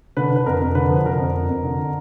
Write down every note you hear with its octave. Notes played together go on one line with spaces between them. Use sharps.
D3 B4
D3 B4
F2 A#4
F2
D3 B4
F3
D3 A#4
F2
F2
F2
D3